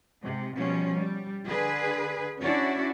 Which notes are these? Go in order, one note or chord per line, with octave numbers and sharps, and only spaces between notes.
G#2 C3
B2 F3 G3 C#4
G3
D3 G#4 B4
C#4 D4 E4 F#4 D5